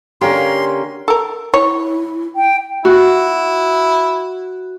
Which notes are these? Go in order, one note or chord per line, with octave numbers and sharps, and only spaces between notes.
D3 A#3 C#4 G4 A#4 C6
A4 A#4
E4 C#5
G5
E4 F#4